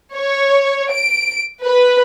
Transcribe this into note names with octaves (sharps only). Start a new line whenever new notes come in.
C#5
D7
B4